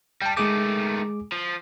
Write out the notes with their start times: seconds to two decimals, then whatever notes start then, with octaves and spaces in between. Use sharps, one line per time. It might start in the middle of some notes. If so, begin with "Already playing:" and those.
0.22 G3 G5 A5
0.37 D#3 G#3 A3 G#4 D6
1.32 F3